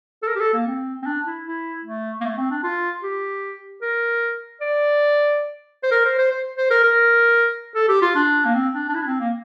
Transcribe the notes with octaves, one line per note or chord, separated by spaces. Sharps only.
A4
A#4
G4
A4
A#3
C4
C4
D4
E4
E4
A3
A#3
A3
C4
D4
F4
G4
A#4
D5
C5
A#4
C5
C5
C5
C5
A#4
A#4
A4
G4
F4
D4
A#3
C4
D4
D4
E4
D4
C4
A#3